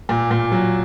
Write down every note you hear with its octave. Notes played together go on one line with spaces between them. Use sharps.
A#2
A#2
F#3